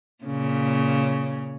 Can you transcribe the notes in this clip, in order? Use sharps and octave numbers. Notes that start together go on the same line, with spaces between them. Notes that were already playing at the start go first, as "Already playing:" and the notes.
A#2 C#3